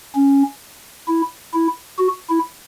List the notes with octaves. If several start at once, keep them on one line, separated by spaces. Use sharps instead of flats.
C#4
E4
E4
F#4
E4